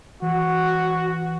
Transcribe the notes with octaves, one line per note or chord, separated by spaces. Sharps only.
E3 F#4